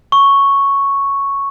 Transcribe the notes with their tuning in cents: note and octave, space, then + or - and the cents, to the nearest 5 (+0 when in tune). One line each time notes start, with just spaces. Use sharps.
C#6 +0